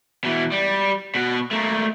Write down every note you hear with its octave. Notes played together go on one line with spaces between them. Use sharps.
B2 E3
G3
B2 F#4
A3 A#3